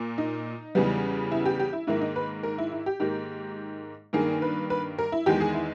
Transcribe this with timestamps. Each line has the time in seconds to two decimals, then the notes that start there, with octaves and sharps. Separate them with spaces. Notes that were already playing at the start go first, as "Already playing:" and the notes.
Already playing: A#2 A#3
0.18 D#4
0.75 E2 C#3 G3 B3
1.32 E4
1.45 G4
1.59 G4
1.73 E4
1.87 G#2 D#3 A#3 E4
2.01 D#4
2.16 B4
2.43 A#4
2.58 E4
2.72 E4
2.86 G4
3.00 G#2 D#3 A#3 G4
4.13 G2 D#3 A#3 G#4
4.42 B4
4.70 B4
4.98 A#4
5.12 E4
5.26 E2 D#3 G#3 G4
5.41 G#4
5.54 E4